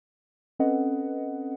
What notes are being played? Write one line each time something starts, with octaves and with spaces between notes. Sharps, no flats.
C4 C#4 A4 B4 D#5 F#5